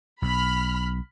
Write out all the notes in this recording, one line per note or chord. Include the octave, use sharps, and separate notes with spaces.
B1 B5 F6